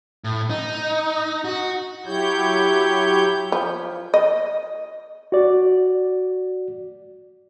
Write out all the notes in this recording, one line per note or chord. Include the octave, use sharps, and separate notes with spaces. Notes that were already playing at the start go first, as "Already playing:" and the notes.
A2
D#4
F#4
F#3 E4 G4 C#5 G6
F3
D#5
F#4 D5